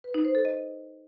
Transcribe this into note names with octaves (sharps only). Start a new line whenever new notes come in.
B4
D#4
C5
A4
D#5